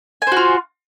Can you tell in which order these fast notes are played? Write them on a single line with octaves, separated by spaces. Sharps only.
G#5 C5 F#4 F4